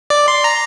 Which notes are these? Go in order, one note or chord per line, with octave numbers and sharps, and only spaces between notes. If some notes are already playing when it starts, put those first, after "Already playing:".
D5
C6
A#5